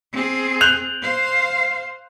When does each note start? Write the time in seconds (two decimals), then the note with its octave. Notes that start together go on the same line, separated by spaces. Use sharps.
0.13 C4 G#4
0.61 F#6 G6 F7
1.03 C5 F5